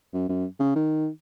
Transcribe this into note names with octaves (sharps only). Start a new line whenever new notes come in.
F#2
F#2
C#3
D#3